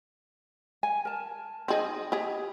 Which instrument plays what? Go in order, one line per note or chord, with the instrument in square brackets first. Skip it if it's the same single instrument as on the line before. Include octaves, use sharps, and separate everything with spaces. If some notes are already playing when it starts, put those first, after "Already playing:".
[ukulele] G#5
A#4 A5
[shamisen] C4 G#4 [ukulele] D#4 D#5
[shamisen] G4 G#4